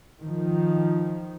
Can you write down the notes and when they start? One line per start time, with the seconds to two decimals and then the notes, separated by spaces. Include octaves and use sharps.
0.22 D#3 F3